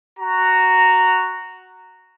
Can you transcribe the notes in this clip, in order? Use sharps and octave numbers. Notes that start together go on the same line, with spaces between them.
F#4 A#5